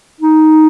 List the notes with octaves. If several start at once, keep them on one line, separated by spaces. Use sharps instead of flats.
D#4